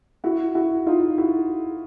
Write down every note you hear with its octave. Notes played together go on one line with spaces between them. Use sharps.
E4 F#4
E4 F#4
D#4 F4
E4 F#4